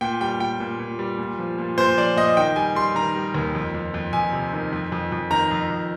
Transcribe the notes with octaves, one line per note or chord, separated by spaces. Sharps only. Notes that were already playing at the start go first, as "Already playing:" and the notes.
A#2 G5
G3 G5
A#2 G5
A#2
A#2
G3
A#2
F3
A#2
A#2 C5
F3 D5
A#2 D#5
D#3 G5
G3 G#5
G3 C6
D#3 A#5
G3
D#2
F2
F2
F2
F2 G#5
C3
D#3
F2
F2
F2
D#3 A#5
F2
F2